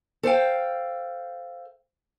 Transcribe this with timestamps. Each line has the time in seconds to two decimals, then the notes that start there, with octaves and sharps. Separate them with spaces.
0.23 A4 C5 F5 G5